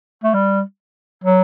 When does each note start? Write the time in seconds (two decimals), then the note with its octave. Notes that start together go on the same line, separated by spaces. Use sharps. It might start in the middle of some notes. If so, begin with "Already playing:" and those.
0.24 A3
0.34 G3
1.24 F#3